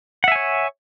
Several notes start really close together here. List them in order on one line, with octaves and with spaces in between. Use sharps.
F#5 E5 G#5 C#5